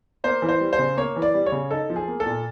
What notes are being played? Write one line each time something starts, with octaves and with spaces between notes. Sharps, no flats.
A#3 C5
E3
C5
G3
C5
C#3
A#3 C#5
E3
D5
G3
C#5
C#3
D#4 A4
F3
G#4
A#3
A4
A#2